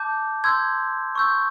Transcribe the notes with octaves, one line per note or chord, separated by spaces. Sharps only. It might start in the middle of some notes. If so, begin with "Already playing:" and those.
Already playing: A5 D6 G6
C6 E6 G6 G#6
C#6 E6 G6